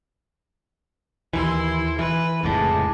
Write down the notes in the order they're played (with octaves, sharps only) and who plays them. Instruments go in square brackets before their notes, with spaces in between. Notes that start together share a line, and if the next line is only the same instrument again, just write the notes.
[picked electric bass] D#2 E3 [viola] E4 C6
[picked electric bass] E3 [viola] B4
[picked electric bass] F1 C#2 A2 [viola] G#3 D4